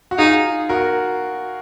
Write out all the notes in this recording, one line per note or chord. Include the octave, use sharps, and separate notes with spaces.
F#4
D#4 F4 G#4
F#4 A#4